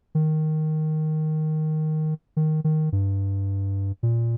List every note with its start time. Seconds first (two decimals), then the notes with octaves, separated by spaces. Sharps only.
0.15 D#3
2.37 D#3
2.64 D#3
2.92 G2
4.03 A#2